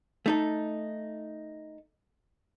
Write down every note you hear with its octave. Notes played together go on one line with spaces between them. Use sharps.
A3 D#4 A4